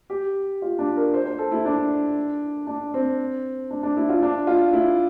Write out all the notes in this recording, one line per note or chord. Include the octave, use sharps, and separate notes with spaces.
G4
F4
D4
A#4
C5
C5
A4
E4
D4
D4
C4
D4
D4
E4
F4
D4
F4
E4